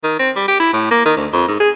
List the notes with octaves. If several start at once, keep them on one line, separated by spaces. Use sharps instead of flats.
D#3
C4
G3
G4
E4
A2
A#3
D#3
D2
F2
G#2
G#4